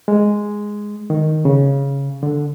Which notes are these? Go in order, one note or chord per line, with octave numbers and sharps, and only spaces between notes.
G#3
D#3
C#3
D3